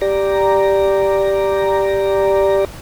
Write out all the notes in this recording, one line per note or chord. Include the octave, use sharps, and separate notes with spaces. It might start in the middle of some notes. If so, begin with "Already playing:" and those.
G4 D5 A#5